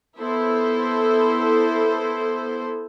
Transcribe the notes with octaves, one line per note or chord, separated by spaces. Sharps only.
B3 E4 A4 C5